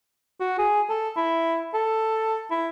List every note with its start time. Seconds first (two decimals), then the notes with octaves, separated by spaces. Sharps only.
0.40 F#4
0.59 G#4
0.90 A4
1.17 E4
1.74 A4
2.51 E4